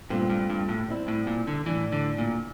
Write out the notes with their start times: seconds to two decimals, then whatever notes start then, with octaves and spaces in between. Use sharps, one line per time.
0.10 G2 A#2 A3 C4 G4
0.30 G2
0.50 G2
0.69 A2
0.88 G3 C4 E4
1.08 A2
1.27 A#2
1.47 D3
1.66 A2 E3 G3 D4
1.92 D3
2.18 A#2